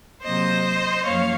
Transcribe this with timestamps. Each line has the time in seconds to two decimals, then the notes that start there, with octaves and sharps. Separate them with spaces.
0.22 C3 F#3 A#3 C5 D#5
1.05 F#2 F3 A#3 C#5 F5